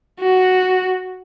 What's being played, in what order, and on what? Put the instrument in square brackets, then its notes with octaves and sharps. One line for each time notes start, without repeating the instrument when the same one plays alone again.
[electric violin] F#4